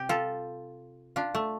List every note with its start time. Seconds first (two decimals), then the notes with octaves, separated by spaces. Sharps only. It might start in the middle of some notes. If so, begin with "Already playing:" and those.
Already playing: C3 G4
0.09 F4 A4
1.16 D4 F4
1.35 A3